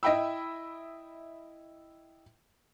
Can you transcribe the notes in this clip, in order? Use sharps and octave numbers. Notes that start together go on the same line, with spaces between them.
E4 D#5 E5 G5 B5 E6